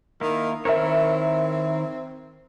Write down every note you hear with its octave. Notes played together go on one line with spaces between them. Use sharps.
D#3 A#3 E4
D#3 C4 E4 A#4 C#5 E5